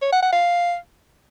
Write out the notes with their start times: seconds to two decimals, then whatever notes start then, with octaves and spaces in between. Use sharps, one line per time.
0.02 C#5
0.12 F#5
0.22 F#5
0.32 F5